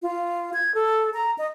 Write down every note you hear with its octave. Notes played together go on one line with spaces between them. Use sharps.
F4
G#6
A4
A#5
D#5